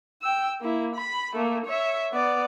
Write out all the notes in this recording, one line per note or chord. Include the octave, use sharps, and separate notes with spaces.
G5 E6
A#3 E4
B5
A3 A#3
C#5 E5
B3 D5